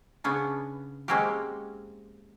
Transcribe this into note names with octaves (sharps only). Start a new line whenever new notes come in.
C#3 B3 C#4 D4
G#3 A#3 C4 C#4 F#4 G4